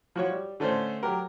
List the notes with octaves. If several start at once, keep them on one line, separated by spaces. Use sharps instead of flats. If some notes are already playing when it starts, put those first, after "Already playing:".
F3 F#4 C#5
G3
D3 A3 C#4 A4 C5
F#3 G4 A#4